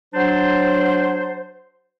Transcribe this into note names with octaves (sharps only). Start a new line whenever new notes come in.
F#3 D4 C5